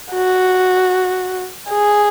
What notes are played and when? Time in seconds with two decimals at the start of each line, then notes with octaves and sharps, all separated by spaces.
0.12 F#4
1.70 G#4